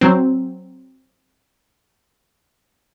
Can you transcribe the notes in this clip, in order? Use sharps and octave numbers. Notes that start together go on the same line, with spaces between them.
F#3 C4